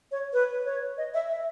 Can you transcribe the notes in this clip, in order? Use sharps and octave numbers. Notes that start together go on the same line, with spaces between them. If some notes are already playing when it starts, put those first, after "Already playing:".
C#5
B4
C#5
D#5
E5
E5